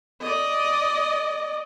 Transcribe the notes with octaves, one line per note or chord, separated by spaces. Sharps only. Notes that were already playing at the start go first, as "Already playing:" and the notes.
D5 D#5